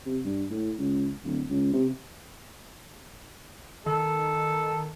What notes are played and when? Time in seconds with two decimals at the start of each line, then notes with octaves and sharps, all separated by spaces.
0.06 C3
0.24 G2
0.50 A2
0.79 C#2
1.24 D1
1.50 C#2
1.73 C3
3.86 D#3 A4